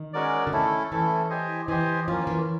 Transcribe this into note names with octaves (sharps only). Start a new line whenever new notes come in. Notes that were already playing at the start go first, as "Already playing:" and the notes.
Already playing: D#3
G#3 C#4 F#4 A#4 D5
D3
D#3 A3 C#4 E4 A4
E3 A3 C#4 E4 A4
G4 C5 D#5 G#5
E3 G4 C5 D#5 G#5
F3 A#3 C#4 F4
E3